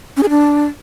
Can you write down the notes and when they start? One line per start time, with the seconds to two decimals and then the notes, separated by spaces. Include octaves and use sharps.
0.17 C#4
0.23 G#4
0.29 D4